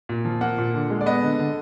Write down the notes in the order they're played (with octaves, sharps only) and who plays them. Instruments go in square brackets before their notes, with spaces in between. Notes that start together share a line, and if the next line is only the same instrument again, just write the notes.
[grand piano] A#2
F3
A#3 F#5
A#2
D3
G#3
D5
B3 D#5
D3
D3